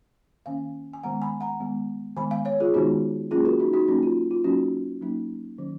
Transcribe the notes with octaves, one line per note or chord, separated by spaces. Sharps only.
D#3 A#3 C#4 F5 G#5
G#5
D#3 G#3 B3 F#5 A#5
G#5 B5
F#5 A#5
D#3 G#3 B3
D#3 G#3 B3 G#5 B5
F5 G#5
C#5 F5
F4 G#4
D#3 G#3 B3 D#4 F#4
F#3 A#3 C#4 F4 G#4
F#4 A#4
D#4 F#4
D#4 F#4
F#3 A#3 C#4 D#4 F#4
F4
F4
F#3 A#3 C#4 D#4 F#4
F#3 A#3 C#4 D#4
D#3 F#3 C#4